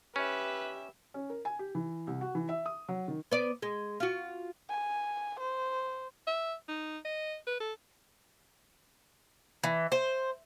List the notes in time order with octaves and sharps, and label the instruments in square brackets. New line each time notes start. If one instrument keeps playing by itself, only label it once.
[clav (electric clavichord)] C#4 [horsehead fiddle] G4 E5 [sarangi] B4
[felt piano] C#4
A#4
G#5
G4
E3
C2
F#4
E3
E5
D#6
F#3
D#3
[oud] B3 D5
G#3
F4 F#4
[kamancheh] G#5
C5
[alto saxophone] E5
D#4
D#5
B4
A4
[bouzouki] E3
C5